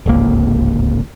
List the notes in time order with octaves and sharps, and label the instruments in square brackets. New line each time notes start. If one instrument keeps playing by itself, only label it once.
[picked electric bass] D1 G#1 C#2 A#3